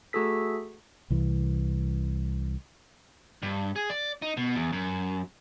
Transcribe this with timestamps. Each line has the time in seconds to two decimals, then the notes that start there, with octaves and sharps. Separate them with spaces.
0.13 A3 F#4 G#4 A4 B6
1.10 C2 E3
3.43 G2
3.76 G#4
3.90 D5
4.22 D#4
4.37 B2
4.55 E2
4.73 F#2